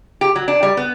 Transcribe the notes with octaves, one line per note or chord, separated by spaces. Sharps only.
G4
F#3
D4
G3
B3